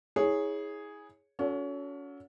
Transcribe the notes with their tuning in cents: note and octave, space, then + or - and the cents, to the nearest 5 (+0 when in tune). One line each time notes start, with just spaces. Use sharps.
E4 -35 G#4 +0 C#5 +0
C#4 +30 F#4 -30 A4 +0